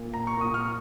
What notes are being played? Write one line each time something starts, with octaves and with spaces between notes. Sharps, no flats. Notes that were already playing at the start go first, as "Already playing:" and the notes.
Already playing: A#2 A#3
A#5
C#6
A#2 A#3 D#6
F6